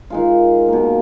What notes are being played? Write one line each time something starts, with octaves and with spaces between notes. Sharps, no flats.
D#3 G#3 F4
B2 A#3